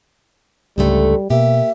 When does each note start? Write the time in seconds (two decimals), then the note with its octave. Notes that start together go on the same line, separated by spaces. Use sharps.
0.78 C#2 G#2 D3 G3 A3
1.30 B2 A#3 G4 E5